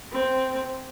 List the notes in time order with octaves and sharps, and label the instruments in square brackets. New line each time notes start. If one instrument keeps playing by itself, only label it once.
[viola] C4